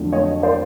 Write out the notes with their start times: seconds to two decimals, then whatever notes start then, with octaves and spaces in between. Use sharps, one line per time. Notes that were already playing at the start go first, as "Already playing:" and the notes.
Already playing: F1 F2 D3 F#3 A3
0.13 C#5 D#5
0.43 C5 D5